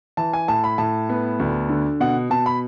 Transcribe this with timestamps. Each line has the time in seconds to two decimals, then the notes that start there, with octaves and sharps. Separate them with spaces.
0.17 E3 A5
0.33 G#5
0.48 A2 A5
0.64 B5
0.78 A2 A5
1.09 B3
1.39 D2
1.69 D3
2.00 B2 F#5
2.30 B2 A5
2.46 B5